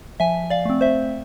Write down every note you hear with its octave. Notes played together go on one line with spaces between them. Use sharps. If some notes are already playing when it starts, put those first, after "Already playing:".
F3 E5 G#5
D5 F5
A3 C4
C5 E5